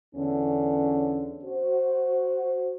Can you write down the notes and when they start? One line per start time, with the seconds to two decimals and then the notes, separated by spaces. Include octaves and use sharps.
0.15 E2 D3 C#4
1.44 F#4 C5